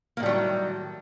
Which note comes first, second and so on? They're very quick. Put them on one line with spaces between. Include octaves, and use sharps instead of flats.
A#3 A2 G3 F#3 D#3